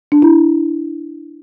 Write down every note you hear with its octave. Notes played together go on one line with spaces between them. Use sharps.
D4
E4